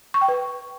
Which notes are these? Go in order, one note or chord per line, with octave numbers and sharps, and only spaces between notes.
C#6
G5
B4